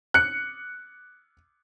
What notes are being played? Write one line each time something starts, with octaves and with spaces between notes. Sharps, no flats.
F#6 C#7